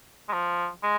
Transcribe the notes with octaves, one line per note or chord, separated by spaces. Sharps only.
G#3
F3
G#3